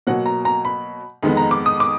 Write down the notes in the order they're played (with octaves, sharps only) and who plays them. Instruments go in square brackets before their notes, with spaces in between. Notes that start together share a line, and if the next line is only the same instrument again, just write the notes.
[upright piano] B2 F#3 A#3 F#5
A#5
A#5
B5
F2 D#3 G#3 B3
A#5
D6
D#6
D6